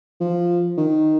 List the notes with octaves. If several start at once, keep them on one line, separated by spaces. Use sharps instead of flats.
F3
D#3